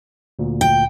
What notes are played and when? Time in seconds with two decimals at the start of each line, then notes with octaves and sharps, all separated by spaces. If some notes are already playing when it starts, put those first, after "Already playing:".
0.39 D2 A#2
0.61 G5